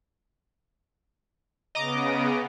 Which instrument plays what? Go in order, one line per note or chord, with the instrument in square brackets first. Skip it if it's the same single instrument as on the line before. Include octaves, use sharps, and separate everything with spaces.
[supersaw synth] C#3 B3 [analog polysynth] D#5 A#5 D6